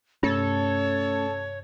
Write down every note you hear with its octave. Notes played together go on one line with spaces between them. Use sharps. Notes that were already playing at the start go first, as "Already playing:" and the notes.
G2 C3 A3 C#4 A4 C#5